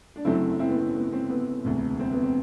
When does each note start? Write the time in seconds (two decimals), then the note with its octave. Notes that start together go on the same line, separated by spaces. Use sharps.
0.16 D4
0.25 F#1 F#2 F#3 A3 C4 E4
0.59 C4 E4
0.69 B3
0.77 C4
0.96 B3
1.12 C4
1.30 B3
1.65 E1 D2 C3
1.99 C4
2.12 B3
2.23 C4